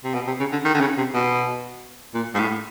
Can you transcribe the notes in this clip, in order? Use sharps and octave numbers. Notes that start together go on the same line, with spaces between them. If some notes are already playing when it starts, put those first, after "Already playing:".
C3
B2
C3
C#3
D3
D#3
D3
C#3
C3
B2
A#2
G#2
A2